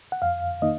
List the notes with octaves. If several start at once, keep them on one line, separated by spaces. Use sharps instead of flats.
F#5
F2 F5
D#3 A#3 D#4 D#5